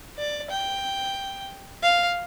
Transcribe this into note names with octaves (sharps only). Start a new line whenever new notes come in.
D5
G5
F5